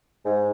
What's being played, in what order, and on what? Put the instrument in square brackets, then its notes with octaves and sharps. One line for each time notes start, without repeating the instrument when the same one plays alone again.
[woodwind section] G#2